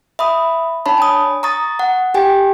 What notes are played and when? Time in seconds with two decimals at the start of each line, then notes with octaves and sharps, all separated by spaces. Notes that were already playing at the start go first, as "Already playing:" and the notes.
0.19 E5 B5 D#6
0.86 D4 C#5 A5 B5
0.98 G#5 D#6
1.43 A#5 C#6 D#6 A6
1.79 F#5
2.14 G4 G5 G#5